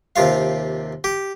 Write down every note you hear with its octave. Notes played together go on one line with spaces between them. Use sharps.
D#2 C3 F4 F5
G4